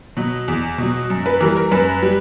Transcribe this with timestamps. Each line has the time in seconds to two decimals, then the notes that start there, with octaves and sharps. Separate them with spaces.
0.17 B2 F#3
0.48 E2
0.78 B2 F#3
1.10 F#2
1.26 B4
1.41 E3 G3 A#4
1.57 A#4
1.72 F#2 B4
2.02 G3